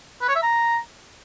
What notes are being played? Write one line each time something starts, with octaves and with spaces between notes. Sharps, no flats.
B4
C#5
E5
A#5